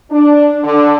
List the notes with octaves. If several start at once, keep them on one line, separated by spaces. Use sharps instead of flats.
D4
D3